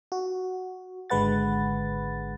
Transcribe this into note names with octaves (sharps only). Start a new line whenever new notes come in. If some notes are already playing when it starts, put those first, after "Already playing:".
F#4
G#1 D3 G#3 B4 F#5 A6